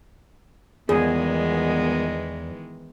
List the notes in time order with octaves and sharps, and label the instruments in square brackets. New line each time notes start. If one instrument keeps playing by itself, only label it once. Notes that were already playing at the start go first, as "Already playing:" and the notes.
[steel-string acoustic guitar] E2 [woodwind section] A#2 G3 B3 [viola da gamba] D#3 E3 G#3 [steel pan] G#4